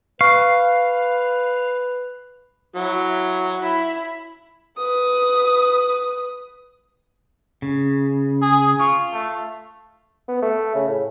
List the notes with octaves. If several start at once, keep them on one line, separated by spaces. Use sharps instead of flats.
B4 F5 C#6
F#3 E4
E4 B5
B4 D#6
C#3
G#4
F4 C#6
A3
B3
A3
C#3
A2